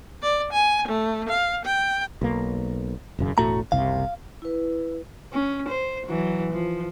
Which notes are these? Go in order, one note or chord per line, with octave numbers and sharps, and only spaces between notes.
D5
G#5
A3
F5
G5
B1 A#3
E1 F#2 C#3
E1 A2 A3 F#4 A#5
F#1 C2 C3 F5
E4 B4
C#4
C5
E3 F#3
F3